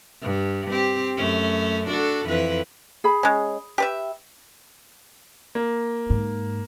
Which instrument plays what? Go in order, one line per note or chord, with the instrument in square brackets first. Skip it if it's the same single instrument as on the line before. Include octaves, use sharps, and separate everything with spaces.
[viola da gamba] G2
C4 G4
F#2 A3 C#4
D4 F#4 A4
F2 E3 B4
[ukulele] G#4 B5
[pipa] G#3 C#4
G4 B4 E5
[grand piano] A#3
[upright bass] G#2